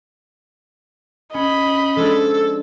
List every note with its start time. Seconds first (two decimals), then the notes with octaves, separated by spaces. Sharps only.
1.34 C#4 D#5 B5
1.96 F3 G#3 D4 A4